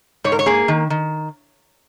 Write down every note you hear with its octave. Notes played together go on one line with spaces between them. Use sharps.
G#2 C#5
A#4
C#5
A#3 G#4
D#3
D#3